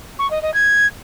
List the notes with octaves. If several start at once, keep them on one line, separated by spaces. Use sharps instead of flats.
C#6
D#5
D#5
G#6